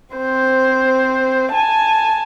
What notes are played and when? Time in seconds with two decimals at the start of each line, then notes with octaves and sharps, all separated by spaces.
0.15 C4 C5
1.53 G#5 A5